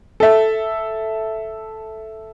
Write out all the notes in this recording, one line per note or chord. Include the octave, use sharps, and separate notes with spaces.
A4 E5